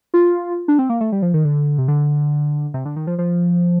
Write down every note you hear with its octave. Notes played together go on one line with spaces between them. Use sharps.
F4
D4
C4
A#3
A3
G3
F3
D#3
D3
C3
D3
C3
D3
D#3
F3
F3